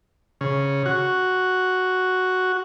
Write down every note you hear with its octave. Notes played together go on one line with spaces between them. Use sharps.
C#3
F#4